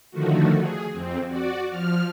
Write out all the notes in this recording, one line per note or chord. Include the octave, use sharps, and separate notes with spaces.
D3 D#3 F3 A3 F#4
G#4
F2 C4
F#4 D5
F3 F6